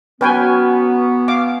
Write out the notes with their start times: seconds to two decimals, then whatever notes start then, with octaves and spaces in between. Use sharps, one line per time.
0.21 F#3 B3 C#4 B4 G5 G#5
1.28 F5 D6